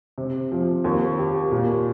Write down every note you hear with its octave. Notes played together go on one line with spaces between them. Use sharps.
C3
F3
D#2
G4
A#2